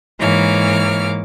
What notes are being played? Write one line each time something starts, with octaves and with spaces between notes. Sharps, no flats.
G#2 E3 A#3 C#5 D6 F6